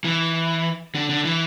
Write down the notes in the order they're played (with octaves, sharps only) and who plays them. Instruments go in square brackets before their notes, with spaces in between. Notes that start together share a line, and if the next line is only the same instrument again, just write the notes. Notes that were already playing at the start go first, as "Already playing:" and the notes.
[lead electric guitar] E3
D3
D3
E3